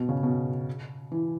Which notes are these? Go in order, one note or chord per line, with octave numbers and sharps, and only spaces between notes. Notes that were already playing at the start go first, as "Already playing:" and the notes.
Already playing: B2
C#3
B2
E3